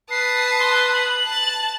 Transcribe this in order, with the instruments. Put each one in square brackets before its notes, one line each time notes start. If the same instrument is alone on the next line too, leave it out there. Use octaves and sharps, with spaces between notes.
[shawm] B4 [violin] A5 D#6 [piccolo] C7
[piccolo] C6
F#7
[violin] A5 A6